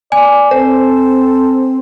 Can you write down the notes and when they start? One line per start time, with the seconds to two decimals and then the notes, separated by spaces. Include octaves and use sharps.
0.12 D5 G#5
0.51 C4 A4 C5